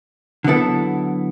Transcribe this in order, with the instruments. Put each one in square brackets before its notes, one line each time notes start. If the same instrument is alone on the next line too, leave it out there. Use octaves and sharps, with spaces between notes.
[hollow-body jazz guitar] D3 F#3 B3 E4 A4